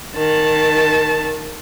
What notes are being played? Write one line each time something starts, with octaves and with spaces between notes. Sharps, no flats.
D#3 A5